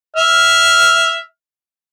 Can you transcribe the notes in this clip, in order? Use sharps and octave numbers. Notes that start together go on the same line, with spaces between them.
E5 F6